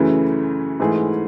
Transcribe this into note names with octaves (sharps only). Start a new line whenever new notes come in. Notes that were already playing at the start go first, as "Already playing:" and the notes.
Already playing: F#2 C#3 E3 A3 E4
G#2 E3 A3 E4 G#4